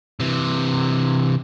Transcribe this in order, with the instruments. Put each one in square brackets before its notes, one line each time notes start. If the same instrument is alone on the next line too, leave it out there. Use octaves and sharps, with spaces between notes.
[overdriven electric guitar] C3 E3